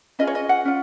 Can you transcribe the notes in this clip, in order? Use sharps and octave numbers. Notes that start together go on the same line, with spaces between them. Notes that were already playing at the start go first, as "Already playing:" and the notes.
C#4 F4 G#4 D#5
C#5
D#5
F#5
C#4 F4